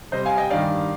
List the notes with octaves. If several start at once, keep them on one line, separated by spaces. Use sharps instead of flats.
C3 G3 C5 D#5
F5 G#5
D#5 G5
G2 D#3 G3 D5 F5